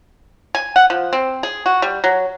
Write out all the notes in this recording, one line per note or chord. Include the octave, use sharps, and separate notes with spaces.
G#5
F#5
F3
C4
G#4
F#4
G3
F#3